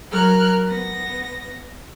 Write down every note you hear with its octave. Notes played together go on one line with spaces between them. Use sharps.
F#3 A#4 F6 F#6
B3 A#6